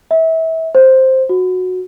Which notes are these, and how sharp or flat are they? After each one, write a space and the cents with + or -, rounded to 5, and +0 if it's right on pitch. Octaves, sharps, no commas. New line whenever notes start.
E5 -30
C5 +5
F#4 -10